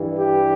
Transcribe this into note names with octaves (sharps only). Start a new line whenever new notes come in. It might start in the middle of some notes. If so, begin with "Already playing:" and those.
Already playing: G2 E3 G3
G4